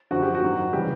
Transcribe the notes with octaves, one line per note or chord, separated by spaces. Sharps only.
F#2 D3 F3 F#4
G4
F#4
G#2 D#3 F#3
C#3 E3 G3 G4